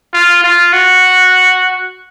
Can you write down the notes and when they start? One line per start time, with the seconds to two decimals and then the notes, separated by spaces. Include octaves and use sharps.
0.14 F4
0.44 F4
0.73 F#4